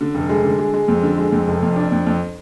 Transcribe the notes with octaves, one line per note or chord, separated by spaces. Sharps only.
D3
F1
G#3
D3
G#3
G#3
F2
D3
G#3
F2
F1
F2
D4
F2
F2